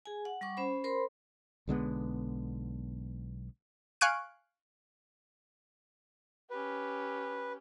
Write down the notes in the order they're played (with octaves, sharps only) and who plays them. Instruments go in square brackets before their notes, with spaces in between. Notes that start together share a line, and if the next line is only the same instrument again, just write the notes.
[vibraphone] G#4 G#5
F#5
G3 F#5 C#6 D6
C#4 C5 B5
A#4 C5 B5 C6
[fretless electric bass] B1 D3 G#3 B3
[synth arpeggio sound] F5 G#5 C#6 F#6 D7 D#7
[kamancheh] C#4 G4 [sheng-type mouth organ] B4